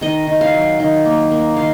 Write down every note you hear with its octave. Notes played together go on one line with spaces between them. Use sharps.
D#3 D#5
D#3
F5
F#3
D#3
A#3
A#3
D#3 F5